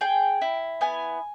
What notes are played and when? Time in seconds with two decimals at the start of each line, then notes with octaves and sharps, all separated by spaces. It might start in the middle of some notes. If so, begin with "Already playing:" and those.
0.01 G#4 G5
0.41 E4
0.81 B3 G#5